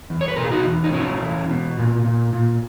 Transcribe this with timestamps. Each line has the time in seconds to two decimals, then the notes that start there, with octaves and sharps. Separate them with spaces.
0.10 E2
0.21 C#5
0.28 B4
0.36 B2 A#4
0.44 G#4
0.51 D#4 F#4
0.65 E2
0.84 D#4
0.93 B2 C#4 E4
1.21 E2
1.50 B2
1.77 A#2
2.05 A#2
2.33 A#2